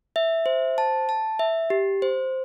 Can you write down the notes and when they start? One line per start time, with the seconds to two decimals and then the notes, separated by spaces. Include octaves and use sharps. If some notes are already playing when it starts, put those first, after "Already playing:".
0.16 E5
0.46 C5
0.78 A5
1.09 A5
1.39 E5
1.70 G4
2.02 C5